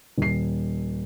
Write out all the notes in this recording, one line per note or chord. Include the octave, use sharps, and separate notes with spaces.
D#1 C7